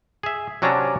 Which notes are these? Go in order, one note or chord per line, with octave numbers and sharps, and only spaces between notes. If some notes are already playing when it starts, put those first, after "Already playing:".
G#4 E5
C3 F#3 C#4 D4 A5 A#5